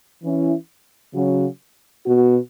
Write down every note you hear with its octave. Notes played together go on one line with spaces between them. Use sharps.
E3 C#4 E4
C#3 F#3 C#4 F#4
B2 B3 F#4